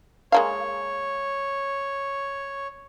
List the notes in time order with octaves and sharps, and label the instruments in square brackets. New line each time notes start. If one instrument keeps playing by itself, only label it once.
[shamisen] G#3 A#3 F5 [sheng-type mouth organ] C#5